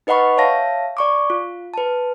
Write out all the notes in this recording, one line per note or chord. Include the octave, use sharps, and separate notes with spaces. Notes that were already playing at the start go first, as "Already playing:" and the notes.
D#4 B4 D#5 F#5 B5 C#6
C#5 E5 F5 A5 A#6
D5 C#6 D6
F4
B4 A5